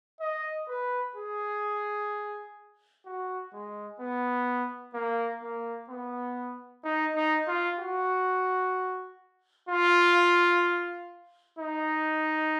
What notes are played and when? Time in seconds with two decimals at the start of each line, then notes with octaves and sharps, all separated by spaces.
0.21 D#5
0.68 B4
1.16 G#4
3.06 F#4
3.53 G#3
4.00 B3
4.94 A#3
5.42 A#3
5.90 B3
6.84 D#4
7.15 D#4
7.48 F4
7.79 F#4
9.69 F4
11.59 D#4